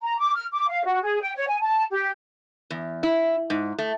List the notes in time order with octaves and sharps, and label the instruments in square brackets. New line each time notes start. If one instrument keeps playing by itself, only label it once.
[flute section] A#5
D6
F6
D6
F5
F#4
G#4
G5
C#5
G#5
A5
G4
[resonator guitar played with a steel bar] E2
E4
G#2
A3